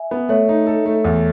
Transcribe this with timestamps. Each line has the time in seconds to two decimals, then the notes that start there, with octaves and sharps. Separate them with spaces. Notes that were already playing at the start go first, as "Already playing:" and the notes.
Already playing: E5 G#5
0.11 B3
0.29 A3 C#5 E5
0.49 D#4
0.67 A4
0.86 A3
1.04 E2